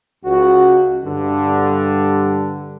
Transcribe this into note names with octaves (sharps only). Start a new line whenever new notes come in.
C#2 F#4
G2 D3